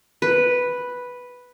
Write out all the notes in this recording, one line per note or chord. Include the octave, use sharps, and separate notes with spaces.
B4